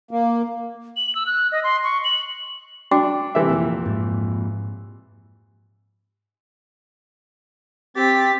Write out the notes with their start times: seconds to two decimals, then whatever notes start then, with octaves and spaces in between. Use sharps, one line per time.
0.11 A#3
0.96 F#7
1.15 E6
1.27 F#6
1.52 D#5
1.64 C6
1.84 C#6
2.04 F#7
2.91 D4 F#4 G5 D6
3.35 C3 E3 E5
3.49 F2 A#2
3.86 G#2
7.96 C4 G4 A6 B6